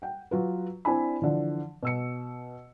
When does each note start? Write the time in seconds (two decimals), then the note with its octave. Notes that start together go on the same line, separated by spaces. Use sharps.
0.02 F#5 G5
0.31 F#3 F4 B4
0.85 C4 D4 E4 D5 G#5 B5
1.22 D3 E3 F3
1.83 B2 E6 C#7